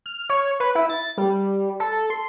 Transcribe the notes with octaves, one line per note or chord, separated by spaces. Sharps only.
F6
C#5
B4
E4
A6
G3
A4
C6